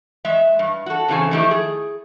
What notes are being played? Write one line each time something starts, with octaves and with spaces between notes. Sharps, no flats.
G#3 E5
G2
F#4 A4
E2 C#3 C4 F4 A4 G#5
D#3 F3 A3 E4 G4
G#4